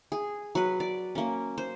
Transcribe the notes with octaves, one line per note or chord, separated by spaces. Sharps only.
G#4
F#3 B4
D5
A#3 C#4
C5